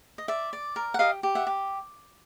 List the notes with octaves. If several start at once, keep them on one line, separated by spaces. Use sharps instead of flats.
D#5
D5 E5
D5
A#4
F#5
G4 D#5 F5
G4
E5 F#5
G4